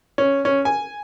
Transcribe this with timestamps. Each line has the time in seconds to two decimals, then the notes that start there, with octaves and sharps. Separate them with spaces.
0.18 C#4
0.45 C#4
0.65 G#5